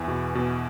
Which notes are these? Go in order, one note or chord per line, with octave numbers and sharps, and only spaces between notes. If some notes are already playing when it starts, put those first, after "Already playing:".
Already playing: E2 E3
B2
B2